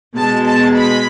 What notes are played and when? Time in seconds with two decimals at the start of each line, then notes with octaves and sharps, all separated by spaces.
0.16 B2 G#3 A5
0.46 A5
0.76 B5